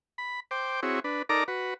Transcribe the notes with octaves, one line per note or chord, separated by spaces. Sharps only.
B5
C5 G5 D6
C4 E4 F#4 G#4 C#5
D4 B4
D#4 A4 A#4 D5 A#5 D6
F#4 B4